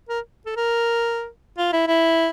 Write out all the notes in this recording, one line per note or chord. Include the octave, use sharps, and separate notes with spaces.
A#4
A4
A#4
F4
E4
E4